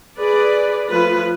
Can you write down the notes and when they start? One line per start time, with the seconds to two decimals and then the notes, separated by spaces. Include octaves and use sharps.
0.19 G#4 B4 D5
0.89 F3 A3 F4 B4